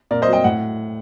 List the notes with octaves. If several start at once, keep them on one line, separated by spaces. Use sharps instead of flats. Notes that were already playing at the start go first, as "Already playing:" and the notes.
A#2 A#4 D5
C5 D#5
F#3
D#5 G5
A2 F#5